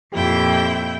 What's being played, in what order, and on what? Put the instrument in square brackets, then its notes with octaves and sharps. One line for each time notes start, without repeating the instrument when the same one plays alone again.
[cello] F2 A#2 [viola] E4 G5 [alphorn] G4